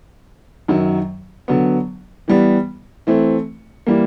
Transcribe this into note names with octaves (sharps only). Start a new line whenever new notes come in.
F#2 D#3 F#3
D3 F#3 B3
E3 G3 B3
E3 A3 C4
E3 G3 A#3